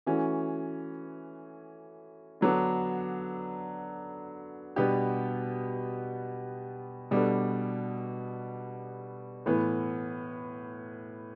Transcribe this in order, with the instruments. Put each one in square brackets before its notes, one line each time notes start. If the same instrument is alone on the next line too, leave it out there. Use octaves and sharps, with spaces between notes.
[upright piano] E3 A3 C#4 F#4
D3 F#3 B3 D4 A4
B2 G3 B3 D4 G4
B2 G3 B3 D4 A4
A2 E3 B3